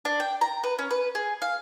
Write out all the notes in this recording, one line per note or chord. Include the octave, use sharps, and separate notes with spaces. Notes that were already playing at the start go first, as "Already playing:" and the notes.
D4
G5
A#5
B4
C#4
B4
G#4
F5